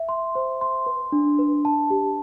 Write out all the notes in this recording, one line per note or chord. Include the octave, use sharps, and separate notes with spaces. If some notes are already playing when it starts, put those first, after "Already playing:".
Already playing: E5
C6
C5
C6
B4
D4
B4
A5
G4